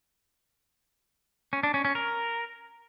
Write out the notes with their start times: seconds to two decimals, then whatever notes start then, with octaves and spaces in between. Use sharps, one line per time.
1.53 C#4
1.63 D4
1.74 C#4
1.85 C#4
1.95 A#4